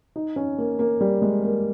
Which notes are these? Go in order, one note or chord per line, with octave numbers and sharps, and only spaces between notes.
D#4
C#4
A#3
A#3
G3
G#3
A#3